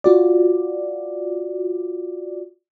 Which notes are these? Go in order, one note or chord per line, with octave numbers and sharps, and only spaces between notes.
F4 F#4 D5